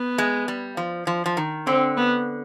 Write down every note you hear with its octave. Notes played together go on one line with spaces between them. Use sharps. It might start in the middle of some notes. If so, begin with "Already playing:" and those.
Already playing: B3
G#3
G3
F3
F3
F3
D#3
D3 C4
B3